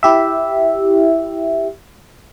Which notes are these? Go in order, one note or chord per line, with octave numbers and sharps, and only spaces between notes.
E4 G4 E5